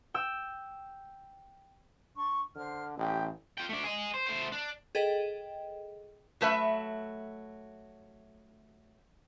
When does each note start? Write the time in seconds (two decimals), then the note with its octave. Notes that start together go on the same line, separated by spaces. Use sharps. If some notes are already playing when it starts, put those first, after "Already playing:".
0.14 G5 E6
2.16 D4 C6 C#6
2.55 D3 C5 F6
2.97 A1 G4 G5 D#6
3.58 F4 G5
3.69 A3 D4
3.84 G#4 D#5
4.14 C5
4.27 A3 C5
4.52 D4
4.95 G#4 A4 B4 D#5 G5
6.41 F#3 A3 B4 E5